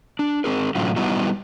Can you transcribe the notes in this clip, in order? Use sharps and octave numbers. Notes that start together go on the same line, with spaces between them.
D4
C4 G#4 A#4
A2 D3 F#3 C#4 F4
G3 B3 D#4 E4 F#4